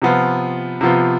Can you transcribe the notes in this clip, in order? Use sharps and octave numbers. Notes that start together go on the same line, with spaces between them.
C3 F3 B3 F4
C3 F3 B3 F4